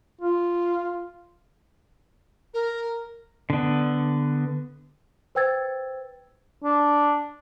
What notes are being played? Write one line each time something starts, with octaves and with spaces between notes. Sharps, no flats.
F4
A#4
D3 B3
B4 C5 G5 E6 G#6 A6
D4